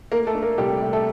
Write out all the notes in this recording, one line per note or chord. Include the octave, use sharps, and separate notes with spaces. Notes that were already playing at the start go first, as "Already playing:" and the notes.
A3 A#3 A#4
A3 A4
D4
A#3 A#4
C2 G3 G4
A3
A3 A4